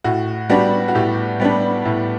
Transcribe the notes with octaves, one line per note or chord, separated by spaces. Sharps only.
A2 F#4
G3 B3 D4 F#4
F#4
A2 G4
G3 B3 D4
A2